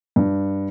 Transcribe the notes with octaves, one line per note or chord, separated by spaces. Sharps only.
G2